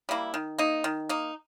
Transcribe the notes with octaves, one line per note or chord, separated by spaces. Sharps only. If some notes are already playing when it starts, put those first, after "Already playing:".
G3 A#3 E4
D#3
A#3 D#4
D#3
A#3 D#4